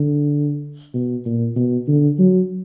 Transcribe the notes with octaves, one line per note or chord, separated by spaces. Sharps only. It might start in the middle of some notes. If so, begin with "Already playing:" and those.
Already playing: D3
B2
A#2
B2
D3
F#3